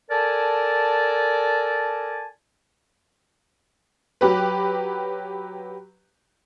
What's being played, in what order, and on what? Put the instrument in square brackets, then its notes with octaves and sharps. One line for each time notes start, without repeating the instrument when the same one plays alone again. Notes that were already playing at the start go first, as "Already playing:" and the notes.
[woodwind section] A4 A#4 D5 G#5 A5
[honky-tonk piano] F#3 G4 B4